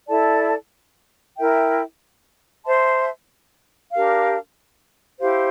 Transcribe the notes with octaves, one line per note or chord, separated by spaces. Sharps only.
E4 A4 D5 A5
E4 A#4 E5 G5
C5 E5 A5 C6
D4 G4 A#4 F5
E4 G4 C5 F5